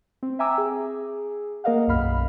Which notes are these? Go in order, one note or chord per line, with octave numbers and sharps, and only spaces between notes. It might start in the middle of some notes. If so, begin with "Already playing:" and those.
C4
E5 G5 G#5 A#5 D6 E6
G#4
A#3 A#4 D#5 F5 F#5
B1 F#2 F5 B5 F6